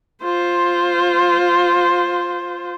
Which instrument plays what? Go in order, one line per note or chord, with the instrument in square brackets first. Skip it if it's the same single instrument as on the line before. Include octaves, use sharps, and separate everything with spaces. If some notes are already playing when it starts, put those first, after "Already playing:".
[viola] F4 C5